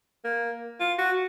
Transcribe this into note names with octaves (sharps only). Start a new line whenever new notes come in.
A#3
F4
F#4